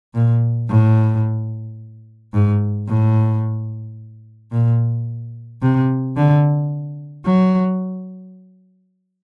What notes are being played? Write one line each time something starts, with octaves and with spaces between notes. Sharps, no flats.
A#2
A2
G#2
A2
A#2
C3
D3
F#3